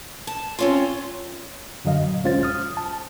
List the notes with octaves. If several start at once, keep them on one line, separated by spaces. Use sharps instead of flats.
A5
C4 C#4 F4
F#2 D3 F#3 D#5 F5
A#2
D2 G#3 C#4 F4 C5 A6
D#6 F6
A5